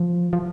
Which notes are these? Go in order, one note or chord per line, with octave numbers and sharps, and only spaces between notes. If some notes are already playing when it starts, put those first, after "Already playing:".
Already playing: F3
F3